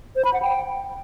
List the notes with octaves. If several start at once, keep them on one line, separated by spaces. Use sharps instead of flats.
C5
B5
F#5
G5